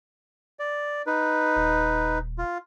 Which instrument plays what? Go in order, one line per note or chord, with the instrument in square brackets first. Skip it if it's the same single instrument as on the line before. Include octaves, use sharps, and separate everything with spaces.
[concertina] D5
D#4 B4
[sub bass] D#1
[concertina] F4